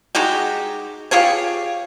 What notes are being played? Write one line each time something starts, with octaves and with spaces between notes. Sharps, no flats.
G#3 D#4 F#4 G4
F4 G4 G#4 C#5